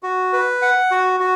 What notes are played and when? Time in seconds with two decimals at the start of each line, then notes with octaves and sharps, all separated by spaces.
0.03 F#4
0.33 B4
0.62 F#5
0.91 F#4
1.20 F#4